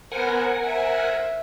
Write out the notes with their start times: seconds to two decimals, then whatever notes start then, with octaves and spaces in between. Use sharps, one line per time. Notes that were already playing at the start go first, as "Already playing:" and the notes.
0.12 B3 A#4 C5 F#5 G#5
0.63 C5 E5